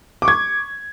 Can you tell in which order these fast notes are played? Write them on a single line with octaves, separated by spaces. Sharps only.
D6 C#6 G#6